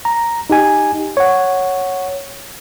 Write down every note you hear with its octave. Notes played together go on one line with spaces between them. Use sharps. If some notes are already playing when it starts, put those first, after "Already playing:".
A#5
D#4 G4 G#5
C#5 F#5